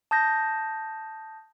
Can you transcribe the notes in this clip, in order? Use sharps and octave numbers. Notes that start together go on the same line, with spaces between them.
A5 D#6 G6 A#6